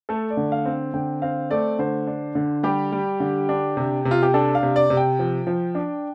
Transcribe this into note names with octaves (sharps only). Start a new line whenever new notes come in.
A3 A4
D5
D3
F5
C4
D3 G5
C4 F5
A3 D5
D3 C5
D4
D3
G3 G4
G3
D3
D4
C3
C3
F4
G4
D4 A4
F5
C3
D5
C3
G5
F3
F3
D4